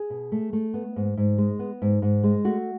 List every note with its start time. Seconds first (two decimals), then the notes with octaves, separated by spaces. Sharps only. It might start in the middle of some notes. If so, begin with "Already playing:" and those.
Already playing: G#4
0.10 B2
0.32 A3
0.53 A3
0.74 B3
0.96 G#2
1.17 G#2
1.38 G#3
1.59 B3
1.82 G#2
2.02 G#2
2.23 G#3
2.44 A3 F#4